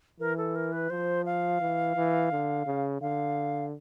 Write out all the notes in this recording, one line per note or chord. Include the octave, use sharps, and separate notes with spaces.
E3 A#4
A4
A#4
B4
F3 C5
F5
E3
E3
D3
C#3
D3 F5